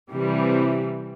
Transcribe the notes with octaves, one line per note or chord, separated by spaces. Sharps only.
C3 E3 G3